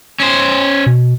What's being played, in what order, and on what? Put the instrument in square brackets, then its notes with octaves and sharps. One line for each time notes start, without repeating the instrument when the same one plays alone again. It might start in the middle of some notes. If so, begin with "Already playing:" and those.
[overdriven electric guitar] C#4 C5
[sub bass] B2